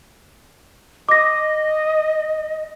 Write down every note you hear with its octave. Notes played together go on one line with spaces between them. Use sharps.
D#5 D6 A#6